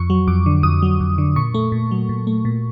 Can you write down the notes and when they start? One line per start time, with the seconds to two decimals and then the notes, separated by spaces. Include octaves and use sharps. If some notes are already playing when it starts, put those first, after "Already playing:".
Already playing: F2 C#6
0.10 F#3
0.28 F2 D6
0.46 D3
0.63 F2 D#6
0.82 F#3
1.01 F2
1.18 D3
1.36 A#2 C#6
1.54 A3
1.72 A#2
1.91 F#3
2.09 A#2
2.27 A3
2.45 A#2